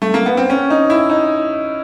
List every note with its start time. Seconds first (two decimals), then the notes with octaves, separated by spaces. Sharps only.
0.02 A3
0.14 A#3
0.26 B3
0.37 C4
0.50 C#4
0.70 D#4
0.90 E4
1.10 D#4